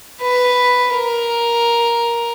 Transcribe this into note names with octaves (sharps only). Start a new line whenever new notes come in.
B4
A#4